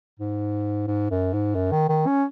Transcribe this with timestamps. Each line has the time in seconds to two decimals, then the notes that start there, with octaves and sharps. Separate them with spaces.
0.20 G#2
0.87 G#2
1.10 F#2
1.33 G#2
1.55 F#2
1.72 D#3
1.89 D#3
2.06 C#4